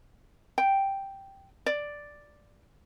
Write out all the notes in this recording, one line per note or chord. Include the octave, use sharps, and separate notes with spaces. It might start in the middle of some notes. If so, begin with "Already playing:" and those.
G5
D5